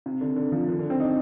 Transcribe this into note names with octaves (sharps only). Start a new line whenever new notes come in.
C3
D3
D3
F3
D3
D3
C4
D#4